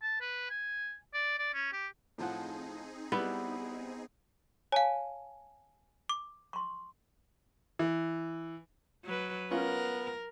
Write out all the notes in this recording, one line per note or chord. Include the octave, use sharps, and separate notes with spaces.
A5
B4
G#5
D5
D5
C#4
G4
A2 F3 C4 D#4 G#4 F#5
G3 B3 E4 B4
C#5 F5 G#5 A5
D6
C6 C#6
E3
F#3 B4
B3 C#4 F4 A#4